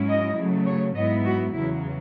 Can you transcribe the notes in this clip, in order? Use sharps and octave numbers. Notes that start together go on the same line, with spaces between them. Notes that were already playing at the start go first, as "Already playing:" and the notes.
Already playing: G#2 F#3 C#4 E4
D#5
C#3 F#3 A3
C#5
G#2 F#3 B3 E4 D#5
F#4
E2 C#3 F#3 E4